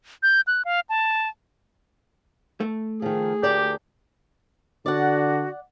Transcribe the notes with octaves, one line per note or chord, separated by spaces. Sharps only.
G6
F#6
F5
A5
A3
D#3 F3 G#4
D2 G4 A#4 D5
D3 F#4 D5 F#5